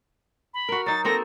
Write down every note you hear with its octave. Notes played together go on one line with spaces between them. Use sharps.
B5
F#4 A#4
F#3 D#4 A6
A#3 C4 A4 A#6